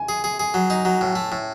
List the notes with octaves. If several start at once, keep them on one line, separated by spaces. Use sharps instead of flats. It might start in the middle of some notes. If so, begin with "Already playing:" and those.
Already playing: G#5
G#4
G#4
G#4
F#3
D#4
F#3
A2
A3
A2